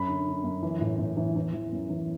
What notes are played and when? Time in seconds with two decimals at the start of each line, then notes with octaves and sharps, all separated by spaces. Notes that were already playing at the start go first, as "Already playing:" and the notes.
Already playing: F#2 B5
0.08 D3
0.27 D3
0.44 F#2
0.63 E3
0.81 A2
0.99 A2
1.17 E3
1.36 E3
1.53 E3
1.72 F#2
1.90 E3